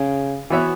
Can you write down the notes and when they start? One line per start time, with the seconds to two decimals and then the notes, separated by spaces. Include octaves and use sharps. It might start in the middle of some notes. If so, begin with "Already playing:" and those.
Already playing: C#3
0.50 E3 B3 F#4 C#5 E5